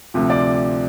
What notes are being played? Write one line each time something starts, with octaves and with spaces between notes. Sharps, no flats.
D2 C3 F3
D5